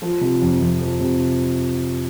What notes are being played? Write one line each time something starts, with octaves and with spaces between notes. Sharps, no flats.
F3
C3
F2
F2
F3
C3